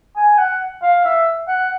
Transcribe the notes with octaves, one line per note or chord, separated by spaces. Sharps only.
G#5
F#5
F5
E5
F#5